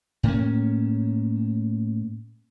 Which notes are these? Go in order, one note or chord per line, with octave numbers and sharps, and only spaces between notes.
A2 A#3 C#4